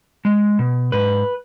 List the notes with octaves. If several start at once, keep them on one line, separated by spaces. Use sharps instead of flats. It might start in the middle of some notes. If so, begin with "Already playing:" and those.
G#3
B2
G#2 B4